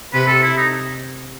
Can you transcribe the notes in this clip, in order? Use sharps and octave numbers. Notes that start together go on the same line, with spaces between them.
C3 B4
A4
E4
D#4